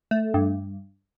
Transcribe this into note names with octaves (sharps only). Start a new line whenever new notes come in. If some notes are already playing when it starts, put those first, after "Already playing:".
A3
G2